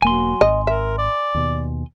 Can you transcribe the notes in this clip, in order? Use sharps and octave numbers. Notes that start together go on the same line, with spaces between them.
E1 F#3 A#3 G#5 C6
G#1 D#5
A#4 E5
D5
D#2 B2